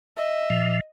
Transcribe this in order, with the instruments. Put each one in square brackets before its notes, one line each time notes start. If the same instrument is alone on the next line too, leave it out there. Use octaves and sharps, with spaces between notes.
[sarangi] D#5 [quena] E5
[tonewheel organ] A#2 F3